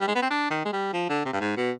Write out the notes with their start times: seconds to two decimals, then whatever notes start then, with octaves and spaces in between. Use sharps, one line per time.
0.01 G3
0.08 G#3
0.15 B3
0.22 C4
0.30 D4
0.50 D#3
0.65 G#3
0.73 G3
0.93 F3
1.09 D3
1.25 C3
1.33 G2
1.40 G#2
1.57 B2